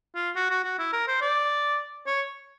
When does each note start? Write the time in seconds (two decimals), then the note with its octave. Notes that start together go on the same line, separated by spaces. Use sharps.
0.15 F4
0.36 F#4
0.50 F#4
0.64 F#4
0.79 E4
0.93 A#4
1.07 C5
1.21 D5
2.06 C#5